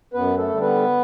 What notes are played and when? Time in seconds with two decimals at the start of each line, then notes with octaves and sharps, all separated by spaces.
0.14 F#2 B3 B4
0.38 A3 A4
0.49 D3 G3
0.61 B3 B4